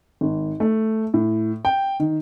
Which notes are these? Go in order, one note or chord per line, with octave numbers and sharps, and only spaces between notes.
G#1
A3
A2
G5
D#3